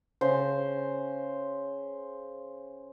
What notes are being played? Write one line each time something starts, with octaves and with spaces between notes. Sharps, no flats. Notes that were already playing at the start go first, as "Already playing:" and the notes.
C#3 C5